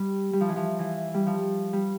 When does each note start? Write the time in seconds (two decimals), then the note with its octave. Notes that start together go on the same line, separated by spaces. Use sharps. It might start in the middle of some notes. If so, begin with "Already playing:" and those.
Already playing: G3
0.33 G3
0.41 F3
0.48 E3
0.56 F3
0.79 E3
1.14 G3
1.27 F3
1.73 G3